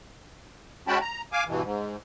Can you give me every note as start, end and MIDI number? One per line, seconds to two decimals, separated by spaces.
0.88 0.99 56
0.88 0.99 61
0.88 0.99 66
0.88 0.99 79
0.88 0.99 81
0.88 0.99 83
1.01 1.22 82
1.32 1.44 77
1.32 1.44 80
1.32 1.44 86
1.47 1.62 43
1.47 1.62 47
1.47 1.62 52
1.63 1.96 44